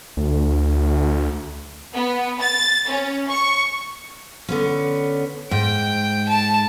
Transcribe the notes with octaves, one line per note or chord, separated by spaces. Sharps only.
D2
B3
A6
C#4
C#6
D3 B3 C#4
G#2 G5
A5